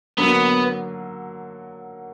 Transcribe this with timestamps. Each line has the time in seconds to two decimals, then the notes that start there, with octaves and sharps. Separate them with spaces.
0.18 D3 F#3 A#3 B3